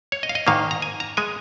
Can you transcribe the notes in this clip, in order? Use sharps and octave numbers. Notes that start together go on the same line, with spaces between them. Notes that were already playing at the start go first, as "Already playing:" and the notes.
C#5
D#5
F5
D#5
G#2 D#3 A#3 F5
A#5
G#5
A#5
G#3 G#5